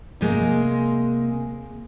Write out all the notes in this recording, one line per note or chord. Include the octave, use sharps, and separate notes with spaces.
C3 G#3 A#3